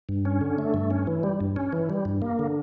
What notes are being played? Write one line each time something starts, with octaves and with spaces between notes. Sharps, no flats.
G2
C#4
D3
A3
G2
C#4
E3
G3
G2
C#4
E3
G3
G2
A#3
D3